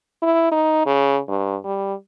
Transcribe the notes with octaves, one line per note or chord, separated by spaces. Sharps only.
E4
D#4
C#3
G2
G3